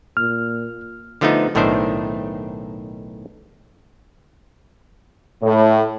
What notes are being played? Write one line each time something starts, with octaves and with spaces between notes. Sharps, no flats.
A#2 F6
D3 F3 A3 B3 D#4
B1 A2 D#3 A3 D4 C5
A2